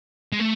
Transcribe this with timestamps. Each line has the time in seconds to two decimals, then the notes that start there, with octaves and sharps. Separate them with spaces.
0.33 G#3
0.40 A3